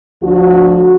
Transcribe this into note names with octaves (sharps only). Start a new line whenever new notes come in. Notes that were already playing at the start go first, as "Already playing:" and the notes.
D2 F3 D4 F#4